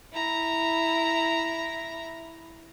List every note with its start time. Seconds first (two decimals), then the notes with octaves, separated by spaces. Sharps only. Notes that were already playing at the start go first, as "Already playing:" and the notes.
0.13 E4 A#5